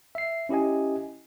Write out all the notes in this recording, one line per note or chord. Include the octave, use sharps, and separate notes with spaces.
E5 C7
C#4 E4 G4 D#5 G#5